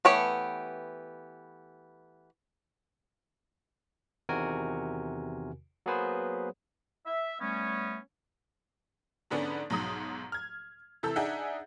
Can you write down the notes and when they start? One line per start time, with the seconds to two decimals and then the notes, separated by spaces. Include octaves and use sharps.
0.05 E3 A3 B3 G4 C#5
4.29 E2 C3 D#3 F#4 A#4 G#5
5.86 F#3 A#3 B3 G#4 B4 C5
7.06 E5
7.40 G3 A3 B3 C#4
9.31 G#2 D3 B3 C#4 D4
9.70 B1 G#2 F#3 D#6
10.32 F6 G#6
11.03 C3 E3 A4 E6 G6
11.16 D4 D#4 G#4 E5 F#5